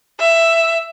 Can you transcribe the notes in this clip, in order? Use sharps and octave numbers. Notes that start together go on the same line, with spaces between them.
E5